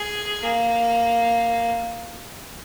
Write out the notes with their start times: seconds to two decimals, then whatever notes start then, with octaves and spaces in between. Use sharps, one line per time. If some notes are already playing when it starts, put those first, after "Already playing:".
Already playing: G#4
0.43 A#3